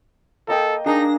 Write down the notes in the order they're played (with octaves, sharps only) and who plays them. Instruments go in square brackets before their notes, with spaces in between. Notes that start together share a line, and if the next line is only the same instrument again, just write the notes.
[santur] A#3 D#5 G5 [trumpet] A4
[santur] A#3 G#4 [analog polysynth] D4 A#6 [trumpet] D#4